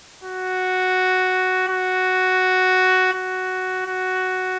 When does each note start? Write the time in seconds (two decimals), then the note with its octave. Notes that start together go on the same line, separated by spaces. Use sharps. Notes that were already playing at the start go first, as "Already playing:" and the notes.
0.24 F#4
1.68 F#4
3.13 F#4
3.86 F#4